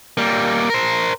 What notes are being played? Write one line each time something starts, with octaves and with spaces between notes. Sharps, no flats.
G3 A#3
A#4 C5